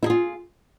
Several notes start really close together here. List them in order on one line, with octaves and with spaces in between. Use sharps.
E4 G#4 F4